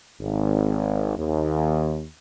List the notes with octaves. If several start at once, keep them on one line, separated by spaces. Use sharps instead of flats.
G#1
D#2